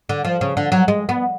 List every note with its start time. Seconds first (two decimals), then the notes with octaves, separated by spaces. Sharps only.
0.09 D3
0.25 F3
0.41 C#3
0.57 D3
0.72 F#3
0.88 G#3
1.09 B3